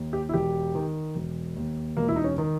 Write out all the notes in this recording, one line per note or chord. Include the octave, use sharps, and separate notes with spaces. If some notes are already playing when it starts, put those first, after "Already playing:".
Already playing: D#2
G4
E4
E1 G4
D#3
E1
D#2
E1 A#3
E4
D#4
C#4
D#3